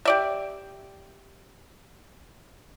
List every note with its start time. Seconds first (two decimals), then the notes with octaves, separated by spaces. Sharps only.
0.05 G4 D5 E5